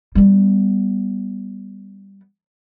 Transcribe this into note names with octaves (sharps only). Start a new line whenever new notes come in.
G3 B3